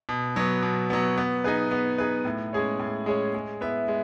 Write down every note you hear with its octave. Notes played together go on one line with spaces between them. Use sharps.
B2
F#3 B3
B2
F#3 B3
B3
D#4 G#4 B4
B3
D#4 G#4 B4
A2
G#3 C#4 G#4 C#5
A2
G#3 C#4 G#4 C#5
G#3
B3 E4 B4 E5
G#3